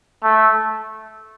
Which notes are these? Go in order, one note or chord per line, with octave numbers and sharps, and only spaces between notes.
A3